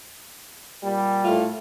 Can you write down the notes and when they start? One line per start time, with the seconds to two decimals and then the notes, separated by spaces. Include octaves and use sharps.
0.84 A#2 G3
1.25 A2 A3 F4